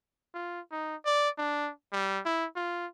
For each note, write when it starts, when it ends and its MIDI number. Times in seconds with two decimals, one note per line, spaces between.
0.35 0.60 65
0.72 0.96 63
1.06 1.30 74
1.38 1.71 62
1.92 2.20 55
2.25 2.46 64
2.56 2.87 65